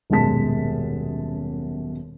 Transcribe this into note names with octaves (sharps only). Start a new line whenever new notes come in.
D#1 F#2 B2 G#3 A5 B6